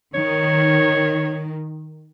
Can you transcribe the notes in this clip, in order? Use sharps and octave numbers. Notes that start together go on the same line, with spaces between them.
D#3 C#5